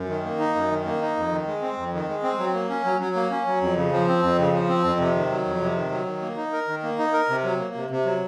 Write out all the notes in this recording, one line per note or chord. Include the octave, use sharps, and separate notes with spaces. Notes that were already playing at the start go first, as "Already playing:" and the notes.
Already playing: F#2
D#3
A#3
D#4
F#2
D#3
A#3
D#4
F2
D#3
G#3
C4
F2
D#3
G#3
C4
F#3
A#3
C#4
F#3
F#3
A#3
C#4
F#3
F2
C#3
F3
C4
F2
C#3
F3
C4
F2
C3
D#3
F#3
F2
C3
D#3
F#3
D#3
A#3
D#4
A#4
D#3
A#3
D#4
A#4
C3
F#3
A#3
C3
C3
F#3